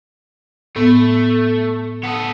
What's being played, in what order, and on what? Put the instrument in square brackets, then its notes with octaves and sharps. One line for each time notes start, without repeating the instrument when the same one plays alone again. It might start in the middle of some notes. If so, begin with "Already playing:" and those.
[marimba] A2 B3 [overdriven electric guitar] A3
[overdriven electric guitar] B3 A4 [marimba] F#5 D#6